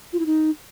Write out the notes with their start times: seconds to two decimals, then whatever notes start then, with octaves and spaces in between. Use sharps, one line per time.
0.13 F4
0.20 E4
0.26 D#4